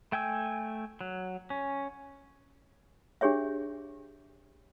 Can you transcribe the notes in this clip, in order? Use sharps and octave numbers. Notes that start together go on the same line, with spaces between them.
A3 G5 G#5 E6
F#3
C#4
D4 G4 G#4 C#5 E5